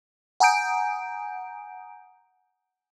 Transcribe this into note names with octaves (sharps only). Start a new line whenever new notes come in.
F#5 G#5 A#5 D#6 G6 D7